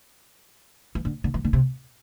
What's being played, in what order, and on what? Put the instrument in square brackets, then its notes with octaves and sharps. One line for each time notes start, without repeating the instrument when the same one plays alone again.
[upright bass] E3
D3
D3
E3
D3
C3